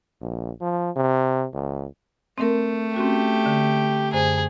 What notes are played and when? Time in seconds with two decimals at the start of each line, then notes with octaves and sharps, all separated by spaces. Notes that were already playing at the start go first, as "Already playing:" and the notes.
0.22 A#1
0.61 F3
0.96 C3
1.53 C#2
2.38 A3 C4 A#4
2.96 C4 C#4 F#4 G4
3.46 D3
4.13 F#2 D3 G#4 C5